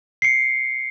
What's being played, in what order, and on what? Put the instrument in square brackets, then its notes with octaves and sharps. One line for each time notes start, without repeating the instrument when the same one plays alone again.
[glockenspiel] C7 C#7